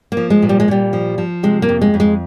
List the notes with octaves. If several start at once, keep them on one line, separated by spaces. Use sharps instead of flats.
A#3
F3
G#3
A#2
G3
G#3
A#2 G3
F3
F3
C3 G#3
A#3
F2
G#3
F2
G#3